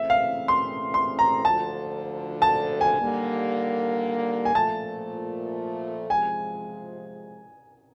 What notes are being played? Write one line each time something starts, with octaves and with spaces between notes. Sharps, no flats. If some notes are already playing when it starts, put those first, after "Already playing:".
Already playing: C#3 E3 A3 C4 E5
F5
C6
C6
A#5
D2 D3 F3 A5
A5
G#5
D#2 D3 G3 A#3
G#5
A#2 F3 A3 A5
C3 F3 G#3 G#5